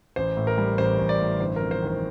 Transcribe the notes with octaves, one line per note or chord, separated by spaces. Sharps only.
A1 C5
A2
A#4
G3
A1 C5
A1
D5
A2
G1 C5
A#4
F2
C5
D#3 C5